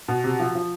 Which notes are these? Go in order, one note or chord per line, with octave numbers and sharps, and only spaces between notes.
B2
C3
F3
F3